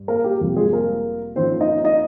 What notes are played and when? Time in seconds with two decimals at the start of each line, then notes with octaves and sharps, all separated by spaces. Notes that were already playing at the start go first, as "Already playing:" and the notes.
Already playing: G2
0.08 A#3 A#4
0.24 G4
0.40 F1 F2 C3 G3 A#3
0.56 G#3 G#4
0.73 A#3 A#4
1.36 F2 D#3 A#3 C4 C#4 C5
1.61 D#4 D#5
1.84 D#4 D#5